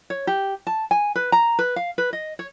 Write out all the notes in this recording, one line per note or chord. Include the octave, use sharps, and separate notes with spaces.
C#5
G4
A5
G#5
B4
A#5
B4
F5
B4
D#5
C#5